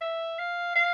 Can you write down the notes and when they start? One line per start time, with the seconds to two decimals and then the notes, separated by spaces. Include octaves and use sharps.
0.01 E5
0.39 F5
0.75 F5